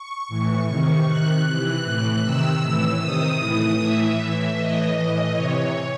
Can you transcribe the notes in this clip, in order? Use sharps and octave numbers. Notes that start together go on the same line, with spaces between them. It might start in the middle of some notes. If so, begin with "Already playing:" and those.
Already playing: C#6
A2 E3
C3 D#3
C3 D#3 F#6
C3 E3
A2 E3
C3 D#3 E6
A2 E3
C3 D#3 D#6
A2 E3
A2 E3 E5
A2 E3
A2 E3 D#5
A2 E3
C3 E3 C#5